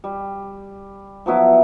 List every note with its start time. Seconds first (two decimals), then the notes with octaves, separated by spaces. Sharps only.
0.04 G3
1.26 F3 F#3 B3 E4